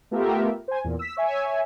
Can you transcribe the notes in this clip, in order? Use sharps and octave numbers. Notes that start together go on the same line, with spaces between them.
A3 B3 F4 G4 A#4 E5
C5 G#5
E2 A#2
E6 B6
C#5 E5 G#5